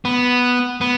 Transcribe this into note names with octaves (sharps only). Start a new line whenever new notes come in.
B3
B3